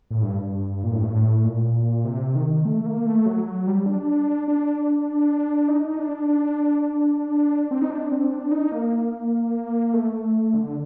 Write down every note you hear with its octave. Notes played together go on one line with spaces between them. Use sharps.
A2
G2
A#2
A2
G2
A2
A#2
C3
D#3
A3
A#3
A3
F#3
F#3
G3
D4
D4
D#4
D#4
D4
C4
D#4
D4
C4
D4
D#4
A#3
A3
D3